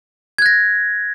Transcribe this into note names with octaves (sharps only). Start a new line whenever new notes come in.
F#6 G#6 A#6